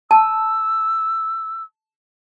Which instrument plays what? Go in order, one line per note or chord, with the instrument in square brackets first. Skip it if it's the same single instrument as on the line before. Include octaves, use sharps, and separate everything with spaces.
[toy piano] A5 [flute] E6